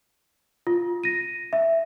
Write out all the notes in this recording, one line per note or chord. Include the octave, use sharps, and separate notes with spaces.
F4
A#6 D#7
E5